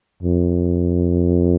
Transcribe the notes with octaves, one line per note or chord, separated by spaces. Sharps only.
F2